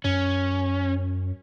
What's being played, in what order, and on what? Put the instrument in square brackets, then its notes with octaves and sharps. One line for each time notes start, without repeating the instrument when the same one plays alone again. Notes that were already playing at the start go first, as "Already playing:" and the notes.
[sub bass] F#2 [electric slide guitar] C#4